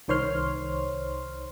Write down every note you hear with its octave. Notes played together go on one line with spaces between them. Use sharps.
C2 D#3 C5 C#5 C6 F6